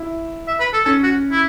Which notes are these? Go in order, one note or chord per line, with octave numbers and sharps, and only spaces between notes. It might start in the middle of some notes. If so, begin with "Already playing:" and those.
Already playing: E4
E5
B4
A4
C#4 A4
F#4
E4